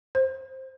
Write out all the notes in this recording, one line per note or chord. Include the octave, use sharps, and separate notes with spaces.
C5